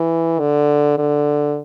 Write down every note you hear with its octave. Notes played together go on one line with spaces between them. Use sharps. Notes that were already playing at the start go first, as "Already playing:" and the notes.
Already playing: E3
D3
D3